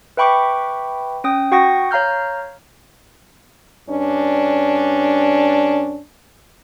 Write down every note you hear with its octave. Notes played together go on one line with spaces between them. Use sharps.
B4 E5 G5 B5 C#6 D6
C#4 G5 D#6
F#4 F#5 G5 C#6 D#6 A#6
C#5 F5 A#5 F6 G6
G2 C#4 D4